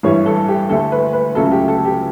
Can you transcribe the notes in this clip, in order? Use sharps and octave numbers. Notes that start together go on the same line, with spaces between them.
A1 G2 E3 G3 C#5
A4
G4
D2 D3 A3 A4
B4
B4
C#2 C#3 F#3 A3 A4
G4
A4
G4